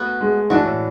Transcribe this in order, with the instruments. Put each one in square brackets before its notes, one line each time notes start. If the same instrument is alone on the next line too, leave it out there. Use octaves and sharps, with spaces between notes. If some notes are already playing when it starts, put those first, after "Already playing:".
Already playing: [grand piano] A3 [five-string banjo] B3 F#4
[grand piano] G#3
[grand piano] E3 [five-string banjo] A3 D4 F#4
[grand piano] A2